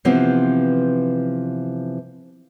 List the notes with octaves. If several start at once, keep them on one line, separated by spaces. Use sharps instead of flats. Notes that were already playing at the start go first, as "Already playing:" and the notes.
C3 E3 F3 B3 C4